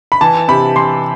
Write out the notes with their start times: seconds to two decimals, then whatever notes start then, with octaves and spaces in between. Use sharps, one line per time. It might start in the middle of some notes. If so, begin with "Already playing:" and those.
0.12 B5
0.21 E3 A5
0.48 C3 B5
0.76 E3 C6